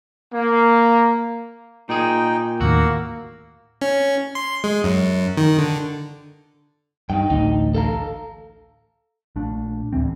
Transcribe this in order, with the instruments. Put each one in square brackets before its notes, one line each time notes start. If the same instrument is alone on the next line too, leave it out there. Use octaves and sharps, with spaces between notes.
[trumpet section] A#3
[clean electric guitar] A#2 G#4 [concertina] D#4 G5
[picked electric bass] D#2 A2 D#3 [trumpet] A#3 [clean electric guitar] F#4 [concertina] E6
[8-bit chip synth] C#4
C6
G#3
F#2
D#3
D3
[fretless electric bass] G2 [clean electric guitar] D#4 G5
[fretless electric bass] A1 D2 [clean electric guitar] D#4
[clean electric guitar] A4 F5 A#5
[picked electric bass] A#1 A3 D4
A1 D2 E3 C4